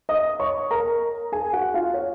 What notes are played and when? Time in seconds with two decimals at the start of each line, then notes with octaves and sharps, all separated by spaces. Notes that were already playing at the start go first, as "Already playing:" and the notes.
0.09 D#5 D#6
0.40 C#5 C#6
0.71 A#4 A#5
1.32 G#4 G#5
1.53 F#4 F#5
1.74 F4 F5
1.94 C#5